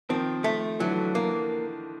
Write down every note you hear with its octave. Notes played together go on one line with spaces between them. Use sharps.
D#3 F3 C4
A3
D3 E3 F#3
A#3